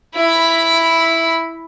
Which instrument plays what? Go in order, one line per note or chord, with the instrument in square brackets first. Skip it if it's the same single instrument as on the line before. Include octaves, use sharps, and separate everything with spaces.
[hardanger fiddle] E4 B5